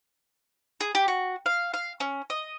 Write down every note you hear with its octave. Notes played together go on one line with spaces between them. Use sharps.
G#4
G4
F#4
F5
F5
C#4
D#5